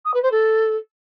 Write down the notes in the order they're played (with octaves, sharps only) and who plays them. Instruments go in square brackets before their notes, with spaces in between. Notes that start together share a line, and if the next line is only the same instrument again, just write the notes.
[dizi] D#6
B4
C5
A4